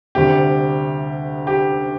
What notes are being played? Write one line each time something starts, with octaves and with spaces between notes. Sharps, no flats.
D2 C3 G3 G4
G4